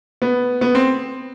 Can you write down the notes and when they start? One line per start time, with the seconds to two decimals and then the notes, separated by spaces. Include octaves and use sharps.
0.22 B3
0.61 B3
0.75 C4